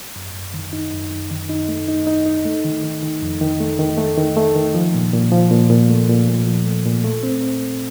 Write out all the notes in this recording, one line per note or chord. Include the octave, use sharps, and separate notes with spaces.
F#2
F#2
D#3
D#4
F#2
F#2
D#3
D#4
A3
D#4
D#4
D#4
A3
D#3
D#3
D#3
F2
D#3
A3
D#3
A3
D#3
A3
D#3
F3
A#2
A#2
F3
A#2
A#2
A3
A#2
A#2
F3
A3
A#2
A3
C4
C4
A3